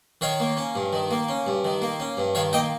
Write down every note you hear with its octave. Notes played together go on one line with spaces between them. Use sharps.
D#3 C#5 F5
A#3
C#4
G2
D#3
A#3
C#4
G2
D#3
A#3
C#4
G2
D#3 C#5 F5
A#3 D#5 G5